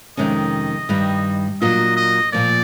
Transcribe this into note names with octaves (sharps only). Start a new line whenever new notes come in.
F2 C3 D#3 G#3 C#4 D#5
G2 D#3 G3
A#2 F#3 A#3 D4 F4 D#5
D#5
A#2 F3 A#3 D5